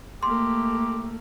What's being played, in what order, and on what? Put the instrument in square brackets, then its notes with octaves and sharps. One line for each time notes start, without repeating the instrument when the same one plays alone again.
[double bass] A3 A#3 [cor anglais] G4 [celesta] C6